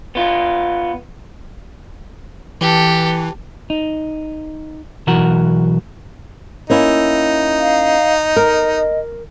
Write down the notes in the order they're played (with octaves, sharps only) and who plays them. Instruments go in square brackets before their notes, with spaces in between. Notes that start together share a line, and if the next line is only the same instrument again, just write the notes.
[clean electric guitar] B3 F4
[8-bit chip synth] E3 [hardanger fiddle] G4 A4
[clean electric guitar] D#4
B1 E3 F#4 A#4 F#5
[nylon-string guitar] A#3 C#4 E4 [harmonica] D#4
[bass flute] F5
[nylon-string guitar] A#4 [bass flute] D#5